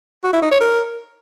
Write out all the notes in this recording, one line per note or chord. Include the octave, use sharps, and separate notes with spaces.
F#4
E4
D#4
C#5
A#4